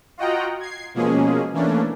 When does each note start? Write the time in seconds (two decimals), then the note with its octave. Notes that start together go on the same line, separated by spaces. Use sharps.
0.18 F4 F#4 D#5 F#5 G5 A#5
0.60 G#6 C7
0.94 B2 F3 G#3 A#3 C#4 G#4
1.54 E3 A3 A#3 C#4 D4